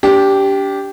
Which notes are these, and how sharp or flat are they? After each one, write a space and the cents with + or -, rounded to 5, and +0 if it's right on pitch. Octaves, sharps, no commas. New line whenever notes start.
D4 -35 G4 -5